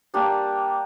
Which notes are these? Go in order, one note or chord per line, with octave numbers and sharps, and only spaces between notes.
G3 A#3 D4 G4